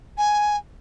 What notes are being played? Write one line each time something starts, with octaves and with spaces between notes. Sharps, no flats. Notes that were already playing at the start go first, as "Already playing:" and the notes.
G#5